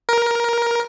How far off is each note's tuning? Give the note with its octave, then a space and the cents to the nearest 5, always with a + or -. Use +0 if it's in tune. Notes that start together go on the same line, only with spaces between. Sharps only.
A#4 +15